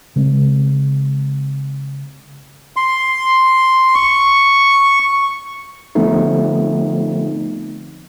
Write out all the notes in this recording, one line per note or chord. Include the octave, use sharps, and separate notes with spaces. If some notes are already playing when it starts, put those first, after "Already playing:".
C#3 G#3 C4
C6
C#6
D3 F3 A3 B3 C4 D#4